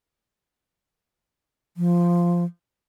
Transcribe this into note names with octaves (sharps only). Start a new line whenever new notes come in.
F3